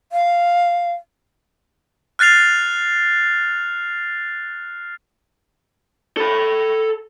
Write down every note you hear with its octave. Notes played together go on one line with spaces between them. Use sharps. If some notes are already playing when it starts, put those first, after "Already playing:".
F5
F6 F#6 A6 C7 F7
A4 B5